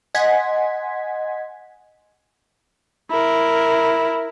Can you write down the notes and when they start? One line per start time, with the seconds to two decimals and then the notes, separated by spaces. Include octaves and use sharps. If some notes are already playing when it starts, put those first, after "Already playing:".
0.14 D#5 F#5 G#5 C6 G#6 B6
3.10 E4 A#4